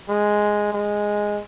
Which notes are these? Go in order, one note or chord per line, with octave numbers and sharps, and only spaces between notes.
G#3
G#3